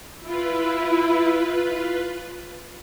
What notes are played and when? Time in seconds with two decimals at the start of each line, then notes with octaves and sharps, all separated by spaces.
0.25 E4 F4 B4